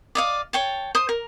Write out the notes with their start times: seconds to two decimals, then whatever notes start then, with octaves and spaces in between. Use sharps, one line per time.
0.15 D5 D#5 F5
0.53 C#5 G5 A5
0.95 C5 D#6
1.09 A#4